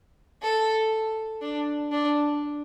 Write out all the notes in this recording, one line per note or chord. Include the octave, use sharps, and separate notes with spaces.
A4
D4
D4